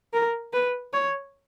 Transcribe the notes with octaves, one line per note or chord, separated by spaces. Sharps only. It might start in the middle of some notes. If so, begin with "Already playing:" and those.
A#4
B4
C#5